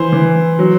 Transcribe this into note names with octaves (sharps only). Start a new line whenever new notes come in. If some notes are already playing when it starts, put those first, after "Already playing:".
Already playing: E3 C5
E3
F#3